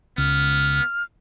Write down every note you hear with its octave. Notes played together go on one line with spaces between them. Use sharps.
C#2 B3 F6